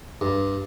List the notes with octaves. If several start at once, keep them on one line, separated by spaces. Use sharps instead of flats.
G2